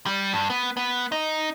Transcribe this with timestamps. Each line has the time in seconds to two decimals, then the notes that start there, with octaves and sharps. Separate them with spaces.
0.06 G3
0.33 G2
0.50 B3
0.77 B3
1.12 D#4